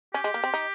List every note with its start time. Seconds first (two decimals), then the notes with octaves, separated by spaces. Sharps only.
0.14 C#4 G4
0.24 G#3
0.34 A#3
0.44 C4
0.54 D#4